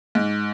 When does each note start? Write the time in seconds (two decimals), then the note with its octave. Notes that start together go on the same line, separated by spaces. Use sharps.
0.15 G#2